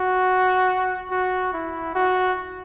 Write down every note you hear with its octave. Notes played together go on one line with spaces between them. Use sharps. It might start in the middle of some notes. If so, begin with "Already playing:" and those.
Already playing: F#4
F#4
E4
F#4